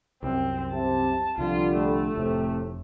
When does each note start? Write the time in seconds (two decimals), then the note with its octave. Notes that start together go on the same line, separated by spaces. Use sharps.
0.23 C2 F#2 C4
0.73 C3 A5
1.38 C2 D3 F3 G3 F4
1.75 A3
2.15 F1 A2 C3